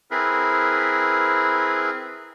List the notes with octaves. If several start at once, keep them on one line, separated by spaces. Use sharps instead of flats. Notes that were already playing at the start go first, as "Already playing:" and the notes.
C4 E4 G#4 A#4 B4